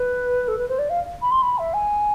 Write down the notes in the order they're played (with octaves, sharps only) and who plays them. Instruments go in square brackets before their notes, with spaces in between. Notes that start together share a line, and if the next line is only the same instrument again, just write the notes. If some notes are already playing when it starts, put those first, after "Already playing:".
Already playing: [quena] B4
A4
B4
C5
D5
F5
B5
C6
B5
E5
G#5